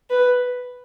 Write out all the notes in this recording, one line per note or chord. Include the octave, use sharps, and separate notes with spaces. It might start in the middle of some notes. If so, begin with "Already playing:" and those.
B4